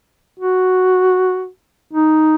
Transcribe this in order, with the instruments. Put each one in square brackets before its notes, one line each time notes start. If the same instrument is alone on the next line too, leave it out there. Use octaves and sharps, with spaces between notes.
[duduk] F#4
D#4